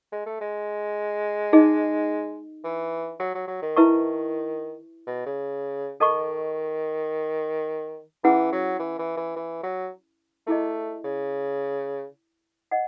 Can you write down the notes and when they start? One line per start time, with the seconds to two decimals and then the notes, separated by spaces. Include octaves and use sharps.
0.12 G#3
0.26 A3
0.41 G#3
1.53 D#4 G#4 D#5
2.64 E3
3.20 F#3
3.35 F#3
3.48 F#3
3.62 D#3
3.76 E4 B4 E5 A5 C#6
5.07 B2
5.26 C#3
6.00 D#3 A4 D#5 A5 C#6
8.24 E3 C#4 E4 G#4 B4 F#5
8.53 F#3
8.80 E3
8.99 E3
9.17 E3
9.36 E3
9.63 F#3
10.47 A3 E4 G#4 D#5
11.04 C#3
12.71 D#5 F#5